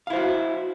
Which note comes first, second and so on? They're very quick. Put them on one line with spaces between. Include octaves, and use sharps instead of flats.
F5 E4 C5 F#4